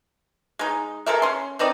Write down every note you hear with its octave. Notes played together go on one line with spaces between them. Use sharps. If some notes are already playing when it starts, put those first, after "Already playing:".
G#3 D#4
G#3 A4 A#4 E5
C#4 C6
D3 C4 D#4 D5